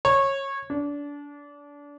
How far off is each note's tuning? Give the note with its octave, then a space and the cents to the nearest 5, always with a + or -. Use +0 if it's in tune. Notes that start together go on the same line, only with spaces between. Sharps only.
C#5 -20
D4 -25